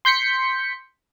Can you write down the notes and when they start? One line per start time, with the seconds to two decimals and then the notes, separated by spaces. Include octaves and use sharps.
0.05 C6 G6 B6 C#7